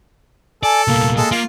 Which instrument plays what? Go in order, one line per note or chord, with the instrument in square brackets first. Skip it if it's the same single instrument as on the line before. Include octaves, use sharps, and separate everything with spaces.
[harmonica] A4 [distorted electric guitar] D5 [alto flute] G#5
[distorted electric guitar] C2 A#2 [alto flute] A#3
[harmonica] G#3 A4
[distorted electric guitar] A#3 [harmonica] F4